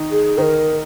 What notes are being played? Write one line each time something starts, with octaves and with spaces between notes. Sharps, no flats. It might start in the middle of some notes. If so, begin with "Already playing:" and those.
Already playing: D#3 D#4
G#4
D#3 D#4 A#4 C5